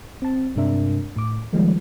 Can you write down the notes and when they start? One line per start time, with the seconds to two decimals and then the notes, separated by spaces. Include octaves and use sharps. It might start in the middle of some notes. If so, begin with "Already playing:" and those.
0.22 C4 A5
0.56 G2 C3 G#3 D4 A#4 E5
1.16 A2 D6
1.53 D#3 F3 G3 G#3 A#3